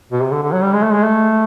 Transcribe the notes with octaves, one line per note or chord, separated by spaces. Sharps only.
B2
C3
D3
D3
F#3
G3
G#3
A3
G#3
A3